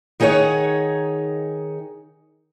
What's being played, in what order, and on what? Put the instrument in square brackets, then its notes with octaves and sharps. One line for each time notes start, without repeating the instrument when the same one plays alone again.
[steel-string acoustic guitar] D#3 D#4 G#4 C5 C#5 F#5